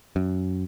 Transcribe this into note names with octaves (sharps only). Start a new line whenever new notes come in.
F#2